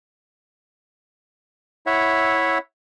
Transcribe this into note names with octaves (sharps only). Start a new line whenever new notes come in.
E4 C#5 E5 F#5